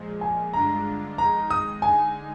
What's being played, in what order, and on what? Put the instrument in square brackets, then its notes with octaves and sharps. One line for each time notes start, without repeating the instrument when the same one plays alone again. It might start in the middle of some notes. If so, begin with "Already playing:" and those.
Already playing: [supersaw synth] A#2 F3 G#3
[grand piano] G#5
[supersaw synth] G2 D3 G#3 D4 F4 [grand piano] A#5
[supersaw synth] F2 D#3 G#3 D#4 [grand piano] A#5
[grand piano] D#6
[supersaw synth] D3 G#3 D#4 [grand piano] G#5